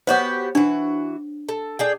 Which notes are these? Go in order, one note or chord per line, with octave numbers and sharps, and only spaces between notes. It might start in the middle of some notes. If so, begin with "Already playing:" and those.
B3 F#4 G4 C5 C#5 F#5
E3 D4 F#4
A4
D4 G#4 G5